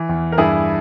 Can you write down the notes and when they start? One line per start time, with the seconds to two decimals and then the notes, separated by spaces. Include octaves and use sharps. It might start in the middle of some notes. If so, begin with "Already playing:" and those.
Already playing: E3
0.09 E2
0.32 A#4
0.38 G2 E4 G#4